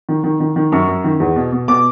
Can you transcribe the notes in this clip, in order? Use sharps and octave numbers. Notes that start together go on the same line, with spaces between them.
D#3
D#3
D#3
D#3
F#2 C#6
F#2
D#3
E2
B2
B2
B2 D6